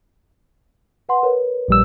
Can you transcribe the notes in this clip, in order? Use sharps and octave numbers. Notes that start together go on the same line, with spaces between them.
B4 F#5 C6
A#4 B4 C#5
A#1 G3 E6